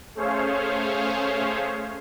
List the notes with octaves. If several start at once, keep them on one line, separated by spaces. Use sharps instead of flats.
A3 C#4 G#4 C5 C#5 F5